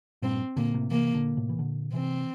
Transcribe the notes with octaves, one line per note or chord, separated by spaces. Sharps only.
G2 A#2 C4
A#2 D3 A#3
A2 C3
C3 E3 A#3
A#2 D3
A2 C3
E3
A#2 D3
C3 E3 C4